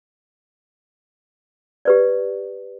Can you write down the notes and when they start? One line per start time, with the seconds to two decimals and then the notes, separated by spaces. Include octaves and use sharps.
1.85 G4 B4 D5